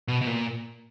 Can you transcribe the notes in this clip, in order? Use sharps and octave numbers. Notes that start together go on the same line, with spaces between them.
B2
B2
A#2